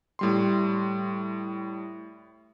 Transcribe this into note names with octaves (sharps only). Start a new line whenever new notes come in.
A2 G3 C6